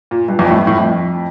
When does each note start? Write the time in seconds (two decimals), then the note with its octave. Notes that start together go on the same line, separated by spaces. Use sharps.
0.11 A#2
0.28 G2
0.39 E2
0.45 F2
0.50 A2
0.56 G2
0.67 A2
0.78 F2